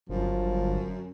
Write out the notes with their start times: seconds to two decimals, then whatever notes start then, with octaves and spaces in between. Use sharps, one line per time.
0.09 G1 F#2 F3